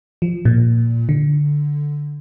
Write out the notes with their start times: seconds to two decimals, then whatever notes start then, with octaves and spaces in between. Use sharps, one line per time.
0.22 F3
0.45 A#2
1.09 D3